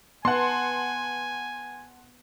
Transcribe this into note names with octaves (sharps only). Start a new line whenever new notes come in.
B3 F#5 G#5 A5 C6